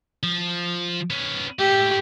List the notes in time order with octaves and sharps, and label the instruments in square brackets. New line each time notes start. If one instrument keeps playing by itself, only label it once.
[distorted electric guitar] F3
B3 C#4
[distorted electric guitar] A3 E4 [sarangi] G4